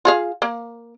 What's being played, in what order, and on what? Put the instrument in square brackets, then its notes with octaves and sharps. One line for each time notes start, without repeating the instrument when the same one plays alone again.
[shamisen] F4 G#4 F5
A#3